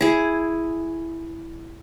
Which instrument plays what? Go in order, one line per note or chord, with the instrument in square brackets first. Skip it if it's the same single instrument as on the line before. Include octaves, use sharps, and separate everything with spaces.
[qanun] E4 G#4